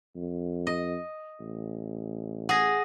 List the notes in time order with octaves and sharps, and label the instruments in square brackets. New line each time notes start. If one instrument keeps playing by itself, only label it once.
[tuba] F2
[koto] D#5
[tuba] A1
[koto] G#4 [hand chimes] F#5 D#6 A#6